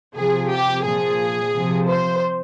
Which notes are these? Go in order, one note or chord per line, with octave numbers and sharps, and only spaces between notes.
C3 F3 G#4
G4
A#2 F3 G#4
C3 F3
C5